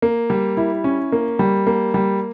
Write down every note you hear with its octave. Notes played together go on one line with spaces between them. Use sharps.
A#3
G3
E4
C#4
A#3
G3
A#3
G3